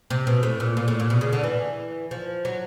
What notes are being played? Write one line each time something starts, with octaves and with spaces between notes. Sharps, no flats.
C3
B2
A2
A#2
A#2
A2
A#2
B2
C#3
D3
E3
F3
F#3